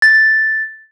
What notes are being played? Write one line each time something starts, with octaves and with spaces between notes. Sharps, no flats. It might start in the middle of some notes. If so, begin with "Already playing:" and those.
A6